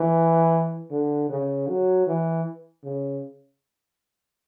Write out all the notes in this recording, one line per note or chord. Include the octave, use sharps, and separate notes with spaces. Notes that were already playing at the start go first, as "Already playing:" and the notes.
Already playing: E3
D3
C#3
F#3
E3
C#3